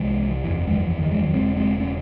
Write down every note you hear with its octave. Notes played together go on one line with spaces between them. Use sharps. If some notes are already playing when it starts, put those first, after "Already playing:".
Already playing: C2 C3 E3 G#3
F#1 E2 C3 E3
E3 G#3
D#3
E3
E3
D#3
E3 G#3
D#3 F#3
E1 D#2 C#3 G#3 C4
G#3 C4
A3 C#4